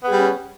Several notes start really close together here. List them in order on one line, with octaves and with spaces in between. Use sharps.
B3 G#4 G3 C#4